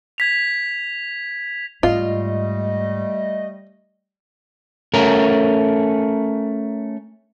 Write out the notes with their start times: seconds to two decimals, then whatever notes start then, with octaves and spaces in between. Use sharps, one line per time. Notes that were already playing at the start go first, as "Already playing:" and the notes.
0.18 G#6 B6 F7
1.83 G#2 G3 A3 F4 D#5
4.94 A3 C#4 A#4